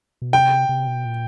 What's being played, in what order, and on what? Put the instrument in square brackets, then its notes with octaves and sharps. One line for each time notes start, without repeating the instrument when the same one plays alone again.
[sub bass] B2
[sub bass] C3 [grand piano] G5
[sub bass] C3
B2
A#2